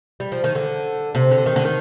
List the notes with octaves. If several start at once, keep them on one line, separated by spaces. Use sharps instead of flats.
G3
F3
D#3
D3
C3
D3
D#3
D3
D#3